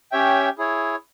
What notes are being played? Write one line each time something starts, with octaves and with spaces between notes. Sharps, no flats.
C#4 G4 C#5 E5 G5
E4 G#4 C#5